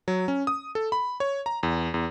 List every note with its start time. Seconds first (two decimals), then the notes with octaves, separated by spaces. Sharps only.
0.08 F#3
0.28 C#4
0.47 D#6
0.75 A4
0.92 B5
1.20 C#5
1.46 A#5
1.63 E2
1.94 E2